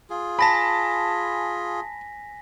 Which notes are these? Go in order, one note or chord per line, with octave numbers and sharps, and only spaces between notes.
F4 G#4
G#5 A5 B5 A#6 B6